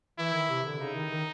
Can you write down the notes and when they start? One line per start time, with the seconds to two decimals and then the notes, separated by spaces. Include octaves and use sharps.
0.18 E3 E4
0.33 D#3
0.49 C3
0.65 D3
0.80 C#3 D#4
0.95 D#3
1.11 D#3